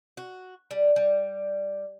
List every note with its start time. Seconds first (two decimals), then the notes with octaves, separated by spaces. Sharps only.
0.17 F#4
0.71 G3
0.96 G3